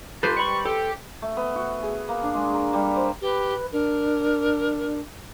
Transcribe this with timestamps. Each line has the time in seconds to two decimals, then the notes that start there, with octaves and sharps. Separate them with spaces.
0.23 F4 G4 A4 B4 C5
0.37 G3 B5 C#6
0.65 G4 A4
1.22 A3
1.37 B3
1.56 F#4
1.82 G#4
2.09 A#3
2.23 D4
2.34 G#3
2.54 A#4
2.73 G3
2.96 C5
3.21 G4 B4
3.72 D4 A#4